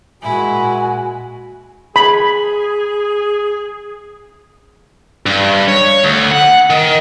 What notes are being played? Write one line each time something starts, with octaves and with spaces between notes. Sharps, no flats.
A#2 G#3 E4 F#4 G#5
G#4 B5
G2
C#5
D2
F#5
D#3